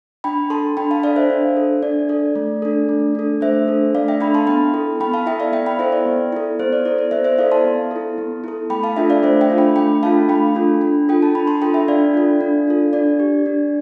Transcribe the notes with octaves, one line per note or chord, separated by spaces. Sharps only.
D4 G5 B5
A4 A5 C6
D4 G5 B5
F5 A5
A4 D5 F5
C5 E5
D4
A4
D4 D5
A4 D5
A3
D4 A4
A3
D4 A4
A3 C5 E5
D4 A4
A3 D5 F5
E5 G5
D4 A4 G5 B5
A5 C6
B3 G5 B5
E4 A4
B3 G5 B5
F5 A5
E4 A4 E5 G5
D5 F5
B3 E5 G5
G5 B5
E4 A4 C5 E5
D5
B3
E4 A4
B3 C5
D5
E4 A4 D5
D5
B3 C5 E5
C5 E5
E4 A4 D5 F5
A5 C6
B3
E4 A4
B3
E4 A4
A3 G5 B5
F5 A5
D4 F4 A4 E5 G5
D5 F5
A3 C5 E5
E5 G5
D4 F4 A4
G5 B5
A3 G5 B5
D4 F4 A4 F5 A5
A3 G5 B5
D4 F4 A4
D4
F4 A4 G5
A5
D4 G5 B5
A5 C6
F4 A4 G5 B5
E5 G5
D4 D5 F5
F4 A4
D4
F4 A4
D4 D5
G4
D4